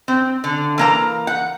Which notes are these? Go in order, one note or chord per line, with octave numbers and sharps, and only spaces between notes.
C4
D3
E3 A#3 A#5
F#5